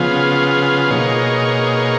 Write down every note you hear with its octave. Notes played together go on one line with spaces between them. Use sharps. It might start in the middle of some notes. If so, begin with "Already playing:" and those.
Already playing: C#3 F3 B3 F4 G#4
B2 A#3 D#4 G#4 C#5